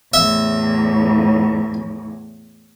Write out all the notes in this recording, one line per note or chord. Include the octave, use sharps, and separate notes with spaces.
E2 A2 E5